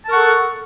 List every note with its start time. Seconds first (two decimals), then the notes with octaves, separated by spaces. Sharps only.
0.06 A5
0.08 A#4
0.11 C#6
0.13 F#5
0.16 A4